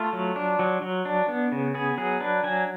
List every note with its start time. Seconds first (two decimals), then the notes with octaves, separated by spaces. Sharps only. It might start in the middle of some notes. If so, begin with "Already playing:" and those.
Already playing: A3 F4
0.13 F#3
0.36 D4
0.59 F#3
0.82 F#3
1.05 D4
1.28 B3
1.52 C#3
1.74 B3 G#4
1.98 F#3 G#4
2.21 D4 B4
2.44 F#3 G#5